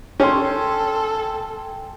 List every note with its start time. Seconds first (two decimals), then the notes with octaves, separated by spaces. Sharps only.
0.20 C#4 A4 G5 G#5 C6